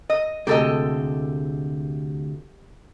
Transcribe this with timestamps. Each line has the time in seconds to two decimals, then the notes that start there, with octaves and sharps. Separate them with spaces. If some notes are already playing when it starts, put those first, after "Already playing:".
0.10 D#5
0.47 D2 C3 G#3 G4 A4 D#5